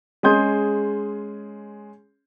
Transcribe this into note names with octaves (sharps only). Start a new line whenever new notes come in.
G#3 C#4 G#4 C6 G6